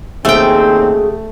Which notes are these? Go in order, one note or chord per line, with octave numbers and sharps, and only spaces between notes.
D#2 C#3 F#3 A3 C4 G#4 G5